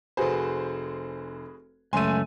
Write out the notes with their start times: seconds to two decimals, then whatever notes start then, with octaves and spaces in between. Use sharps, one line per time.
0.17 F1 F#4 G#4 B4 C5
1.93 C#2 F#2 A3 G#5 C6 D#7